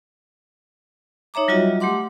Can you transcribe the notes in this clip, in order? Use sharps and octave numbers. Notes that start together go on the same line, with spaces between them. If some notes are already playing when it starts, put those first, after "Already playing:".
D#4 C#5 E5 A#5 D6
F#3 G3 F4 F#4 D#5 E5
A3 G4 F#5 C6 D6